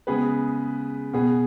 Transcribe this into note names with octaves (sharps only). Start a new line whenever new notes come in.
C#3 G#3 B3 G#4 B4
B2 B3 G#4